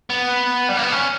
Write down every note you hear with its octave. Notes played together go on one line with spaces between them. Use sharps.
B3
G3
A#3
B3
C#4